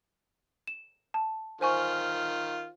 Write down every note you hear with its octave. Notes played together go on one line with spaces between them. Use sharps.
E7
A5
D#3 F4 C5 G#5 C#6